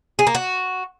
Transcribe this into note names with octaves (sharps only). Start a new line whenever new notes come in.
G#4
A#3
F#4